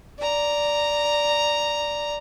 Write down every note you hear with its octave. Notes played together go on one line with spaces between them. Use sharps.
D5 A#5